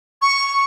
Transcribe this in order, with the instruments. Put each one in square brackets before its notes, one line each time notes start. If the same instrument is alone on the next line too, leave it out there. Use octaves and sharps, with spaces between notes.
[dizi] C#6